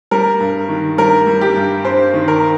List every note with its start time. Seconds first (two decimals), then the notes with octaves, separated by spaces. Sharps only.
0.11 G3 A#4
0.40 G2
0.69 D#3
0.98 G3 A#4
1.27 G3
1.41 G4
1.56 G2
1.84 G2 C5
2.14 D#3
2.28 A#4